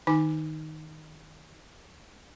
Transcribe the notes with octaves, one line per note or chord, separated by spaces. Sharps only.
D#3 D#4 G#5 D6